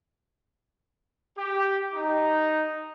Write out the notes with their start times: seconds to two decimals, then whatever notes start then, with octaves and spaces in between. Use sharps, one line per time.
1.36 G4
1.92 D#4